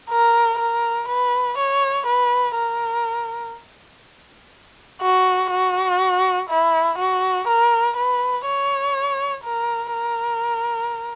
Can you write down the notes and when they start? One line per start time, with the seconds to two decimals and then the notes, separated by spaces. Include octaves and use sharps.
0.10 A#4
0.59 A#4
1.09 B4
1.58 C#5
2.07 B4
2.56 A#4
5.02 F#4
5.51 F#4
6.50 E4
6.98 F#4
7.48 A#4
7.97 B4
8.46 C#5
9.44 A#4
9.93 A#4